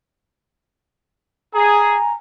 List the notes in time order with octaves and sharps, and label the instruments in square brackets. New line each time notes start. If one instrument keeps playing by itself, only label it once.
[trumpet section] G#4 [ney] G#5 [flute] A#5